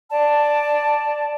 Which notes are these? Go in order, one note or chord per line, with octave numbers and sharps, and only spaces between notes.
D5 A5